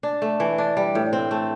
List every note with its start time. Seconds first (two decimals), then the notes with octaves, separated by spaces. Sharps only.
0.03 D4
0.22 A3
0.40 E3
0.58 D4
0.77 G3
0.95 A2
1.13 C4
1.31 A3